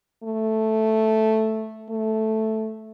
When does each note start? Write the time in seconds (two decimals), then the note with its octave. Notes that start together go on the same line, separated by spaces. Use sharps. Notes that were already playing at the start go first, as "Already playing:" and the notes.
0.24 A3
1.90 A3